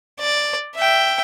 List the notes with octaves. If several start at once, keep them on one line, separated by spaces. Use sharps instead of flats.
D5
E5 G5